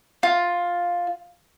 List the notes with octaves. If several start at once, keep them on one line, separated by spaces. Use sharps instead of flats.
F4